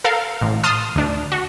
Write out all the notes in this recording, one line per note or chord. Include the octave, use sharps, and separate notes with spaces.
A4 A#4 F5
A1
A5 C6 D#6 F6
D2 D4
F#4